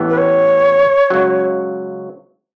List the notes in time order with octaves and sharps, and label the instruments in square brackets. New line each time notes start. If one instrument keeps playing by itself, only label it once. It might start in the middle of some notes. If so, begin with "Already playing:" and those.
Already playing: [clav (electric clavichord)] A1 A2 E3 B3
[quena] B4
C#5
[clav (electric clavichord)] C#2 C#3 F#3